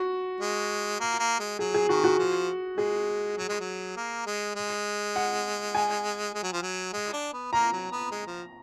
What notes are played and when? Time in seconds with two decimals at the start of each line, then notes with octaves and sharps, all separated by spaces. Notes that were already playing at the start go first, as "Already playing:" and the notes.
Already playing: F#4
0.41 G#3
1.00 A#3
1.19 A#3
1.39 G#3
1.59 F#3 G#4
1.74 G#4
1.89 D#3 F#4
2.04 F#4
2.18 F3
2.77 G#3 G#4
3.38 F#3
3.49 G#3
3.60 F#3
3.97 A#3
4.27 G#3
4.56 G#3
5.16 F#5
5.75 G#5
6.34 G#3
6.43 F#3
6.53 F3
6.62 F#3
6.93 G#3
7.13 D4
7.33 B3
7.53 A#3 A#5
7.73 F#3
7.92 B3
8.12 G#3
8.27 F3